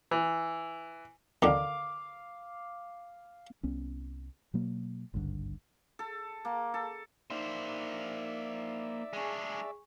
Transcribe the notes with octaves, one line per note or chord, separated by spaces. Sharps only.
E3
D3 D#3 F5 D6
C2 B3 C#4
B2 F#3 A#3
G#1 C#2 G2 D3
A4
A#3
A4
A#3 D#4 C5 D5 E5
G#3 D4 G#4 G#5 C#6